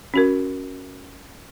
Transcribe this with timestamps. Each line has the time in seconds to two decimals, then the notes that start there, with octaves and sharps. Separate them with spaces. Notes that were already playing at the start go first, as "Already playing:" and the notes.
0.14 C#4 F#4 A#4